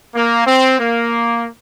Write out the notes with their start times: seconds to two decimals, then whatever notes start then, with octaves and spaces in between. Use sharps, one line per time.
0.15 A#3
0.47 C4
0.79 A#3